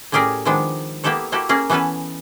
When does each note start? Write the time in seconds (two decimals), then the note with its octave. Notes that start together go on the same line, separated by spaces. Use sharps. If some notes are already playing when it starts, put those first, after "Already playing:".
0.12 A2 C#4 G4 G#4 A#4 D5
0.45 D#3 F3 G#3 B3 D4
1.04 A#3 B3 E4 G4 A4 C#5
1.32 A#3 E4 F#4 G4 A4
1.49 A#3 C#4 G#4 A#4
1.70 E3 B3 C#4 A4 B4